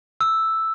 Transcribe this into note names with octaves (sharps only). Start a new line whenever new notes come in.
E6